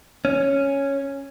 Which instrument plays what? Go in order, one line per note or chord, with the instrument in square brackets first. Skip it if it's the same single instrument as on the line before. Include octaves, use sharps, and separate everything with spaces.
[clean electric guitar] C#4